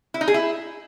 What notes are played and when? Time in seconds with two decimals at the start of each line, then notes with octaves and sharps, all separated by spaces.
0.14 E4
0.21 D#4
0.28 G#4
0.34 E4